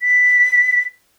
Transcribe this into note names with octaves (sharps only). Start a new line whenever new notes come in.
B6